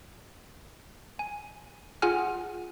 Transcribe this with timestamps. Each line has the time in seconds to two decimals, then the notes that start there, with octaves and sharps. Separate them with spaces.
1.19 G#5
2.02 F4 G#4 F#5 G#5 F6